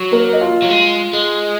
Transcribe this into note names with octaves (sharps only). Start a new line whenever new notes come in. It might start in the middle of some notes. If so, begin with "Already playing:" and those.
Already playing: F#3
A#3 A#4
D#5
F4 F5
F#3
G#3
G#3